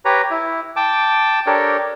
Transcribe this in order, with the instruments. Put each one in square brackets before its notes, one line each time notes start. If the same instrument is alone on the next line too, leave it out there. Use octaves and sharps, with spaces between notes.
[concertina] G4 B4 C#5 A#5
E4
G5 A5 D6
D4 G4 A4 A#4 C#5